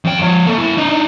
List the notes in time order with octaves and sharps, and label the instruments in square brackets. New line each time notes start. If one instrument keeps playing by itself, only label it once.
[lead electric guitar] F2 G5
F3 C#5
A#3 A4
E4 A#4
D4 D#5
D4 D#4